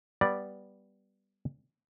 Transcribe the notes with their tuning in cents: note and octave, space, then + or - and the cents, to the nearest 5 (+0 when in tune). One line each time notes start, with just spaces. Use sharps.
G3 +0 B3 -10 D5 +0